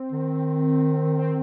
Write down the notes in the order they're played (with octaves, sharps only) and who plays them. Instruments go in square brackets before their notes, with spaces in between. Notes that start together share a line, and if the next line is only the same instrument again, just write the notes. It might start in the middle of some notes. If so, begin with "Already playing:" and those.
Already playing: [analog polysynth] C4
[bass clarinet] D#3
[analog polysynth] C4